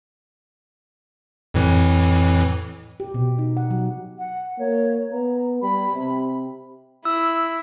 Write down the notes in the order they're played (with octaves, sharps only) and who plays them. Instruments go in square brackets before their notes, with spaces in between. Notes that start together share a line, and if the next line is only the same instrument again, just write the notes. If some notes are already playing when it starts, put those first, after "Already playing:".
[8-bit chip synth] F2 A2 E3
[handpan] G4
B2
D#4
F#5
F#3
[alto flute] F#5
[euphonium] A#3 [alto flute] C#5
[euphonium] B3 [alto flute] A#5
[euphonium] G3 [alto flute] B5
[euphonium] C3
[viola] E4 [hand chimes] E6